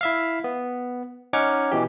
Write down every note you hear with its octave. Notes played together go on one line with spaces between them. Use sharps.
E4 E5 F5
B3
C#4 D#4 F#5 D6 F6 G#6
B2 E3 G4